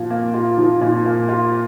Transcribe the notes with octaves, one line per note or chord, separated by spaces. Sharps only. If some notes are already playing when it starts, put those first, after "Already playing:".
Already playing: A#2 F3
A#3
F4
F3
A#2
A#3
F4